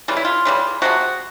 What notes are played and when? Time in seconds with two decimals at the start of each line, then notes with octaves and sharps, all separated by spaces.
0.08 C#3 E3 G3 F4
0.17 E4
0.25 F4
0.45 C#3 E3 G3
0.82 C3 F3 G#3 F#4